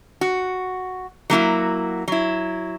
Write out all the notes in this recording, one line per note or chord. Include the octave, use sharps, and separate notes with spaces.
F#4
F#3 A#3 E4 F#4
F#3 E4